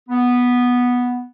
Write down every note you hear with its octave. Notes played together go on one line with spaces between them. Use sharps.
B3